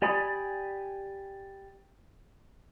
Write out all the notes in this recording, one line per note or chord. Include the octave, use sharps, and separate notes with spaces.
G4 D5 G#5 B5 D#6